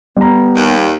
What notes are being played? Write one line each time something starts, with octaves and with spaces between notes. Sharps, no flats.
G3 B3 A#5
D#2